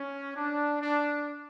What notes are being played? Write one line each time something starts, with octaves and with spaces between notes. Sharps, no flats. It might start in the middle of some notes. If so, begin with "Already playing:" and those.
Already playing: C#4
D4
D4